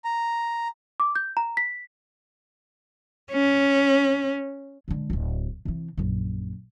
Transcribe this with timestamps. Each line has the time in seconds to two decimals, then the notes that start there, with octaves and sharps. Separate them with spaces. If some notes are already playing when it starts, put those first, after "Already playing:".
0.05 A#5
1.00 D6
1.15 G6
1.37 A#5
1.57 B6
3.32 C#4
4.88 D3 G#3
5.10 D1 C2
5.65 C3 E3
5.98 A#1 F#2